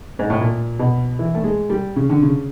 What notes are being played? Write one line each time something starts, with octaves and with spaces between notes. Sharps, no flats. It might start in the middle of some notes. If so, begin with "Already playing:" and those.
G#2
A2
A#2
B2
E3
A3
G#3
G3
C#3
D3
C#3